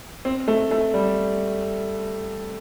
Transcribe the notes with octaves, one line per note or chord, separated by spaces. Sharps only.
C4
A3
A3
G3